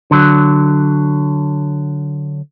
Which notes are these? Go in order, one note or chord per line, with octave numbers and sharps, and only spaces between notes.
D3 F#3